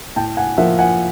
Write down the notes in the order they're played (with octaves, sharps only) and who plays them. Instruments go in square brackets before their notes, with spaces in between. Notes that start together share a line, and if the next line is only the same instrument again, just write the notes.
[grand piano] A2 G5 A5
F#5 G#5
F3 A#3 E5 F#5
F#5 G#5